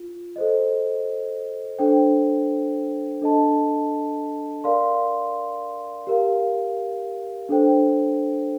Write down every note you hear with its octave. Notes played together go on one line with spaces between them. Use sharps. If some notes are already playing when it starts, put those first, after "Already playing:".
Already playing: F4
A4 C5 D#5
D4 A4 C5 G5
D4 A4 D#5 A5
A#4 D5 F5 C6
G4 A#4 F5
D4 A4 C5 G5